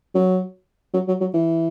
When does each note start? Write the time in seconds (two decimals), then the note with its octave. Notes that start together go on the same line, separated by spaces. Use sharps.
0.15 F#3
0.94 F#3
1.08 F#3
1.21 F#3
1.34 E3